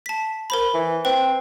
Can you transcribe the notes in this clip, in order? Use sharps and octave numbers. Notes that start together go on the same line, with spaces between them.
A5 B6
A#4 C5 B5
E3
C4 B4